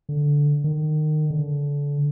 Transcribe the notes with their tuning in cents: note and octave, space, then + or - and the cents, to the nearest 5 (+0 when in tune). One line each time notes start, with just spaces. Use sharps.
D3 -10
D#3 -25
D3 -30